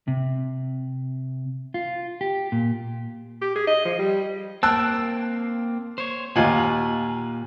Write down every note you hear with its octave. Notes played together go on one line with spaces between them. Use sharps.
C3
F4
G4
A#2
G4
G#4
D#5
F3
G3
A#3 C4 A5 E6 F#6
C5 C#5
D#2 A#2 F4 F#5 G#5